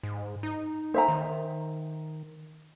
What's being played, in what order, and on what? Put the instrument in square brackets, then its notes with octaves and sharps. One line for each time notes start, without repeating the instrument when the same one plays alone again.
[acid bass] G#2
D#4
[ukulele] C5 E5 A#5
[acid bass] D#3